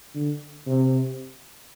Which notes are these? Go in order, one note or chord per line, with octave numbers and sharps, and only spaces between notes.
D3
C3